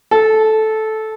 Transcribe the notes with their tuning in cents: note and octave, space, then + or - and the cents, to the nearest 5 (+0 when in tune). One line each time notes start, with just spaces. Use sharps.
A4 -10